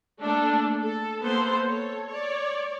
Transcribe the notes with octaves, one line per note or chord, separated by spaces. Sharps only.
A3 A#3 D4 A4
A4
A#3 B3 A4 C5
A4 C#5
C#5 D5